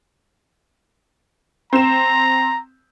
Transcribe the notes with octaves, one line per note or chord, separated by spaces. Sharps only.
C4 A#5 E7